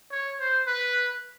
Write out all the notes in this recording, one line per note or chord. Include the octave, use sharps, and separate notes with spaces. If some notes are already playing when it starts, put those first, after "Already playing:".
C#5
C5
B4